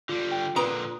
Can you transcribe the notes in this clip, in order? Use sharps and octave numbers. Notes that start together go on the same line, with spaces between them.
D3 G3 F4
G5
A#2 D3 B4 A#5 D#6